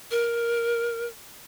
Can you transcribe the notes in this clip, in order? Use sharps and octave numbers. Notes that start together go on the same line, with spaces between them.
A#4